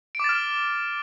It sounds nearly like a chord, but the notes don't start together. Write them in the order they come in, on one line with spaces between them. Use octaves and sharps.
D7 D6 A6 F6